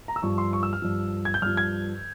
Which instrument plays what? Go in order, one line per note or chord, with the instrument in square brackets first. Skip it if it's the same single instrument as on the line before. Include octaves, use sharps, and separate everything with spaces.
[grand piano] A#5
E6
G2 F3 C#6
C6
C#6
E6
F6
G2 F3
G#6
G6
G2 F3 F6
G#6